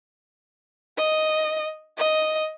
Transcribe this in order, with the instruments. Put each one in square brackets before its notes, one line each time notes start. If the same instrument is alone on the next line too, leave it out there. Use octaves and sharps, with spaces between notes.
[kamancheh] D#5
D#5